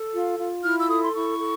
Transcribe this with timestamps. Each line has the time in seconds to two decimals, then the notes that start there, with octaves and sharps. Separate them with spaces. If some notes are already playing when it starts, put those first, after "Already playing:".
Already playing: A4
0.13 F4
0.39 F4
0.63 E4 F6
0.77 E6
0.89 A4 D#6
1.01 C6
1.14 E4 C#6
1.39 A4